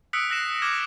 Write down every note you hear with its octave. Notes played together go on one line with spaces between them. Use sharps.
D#6 E6 F#6 B6 C#7 D7
E6 F#6 A#6 C7 E7
D6 F6 G#6 B6 E7